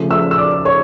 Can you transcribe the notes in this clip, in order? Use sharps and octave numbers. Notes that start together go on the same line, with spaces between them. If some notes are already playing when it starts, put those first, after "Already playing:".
Already playing: C#3 F3 A3
E5 E6
E6
D5 D6
C#5 C#6